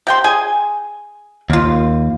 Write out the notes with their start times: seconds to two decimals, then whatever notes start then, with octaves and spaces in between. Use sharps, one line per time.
0.07 C3 G5 C6
0.24 G#4 G#5
1.50 D#2 A#3 F4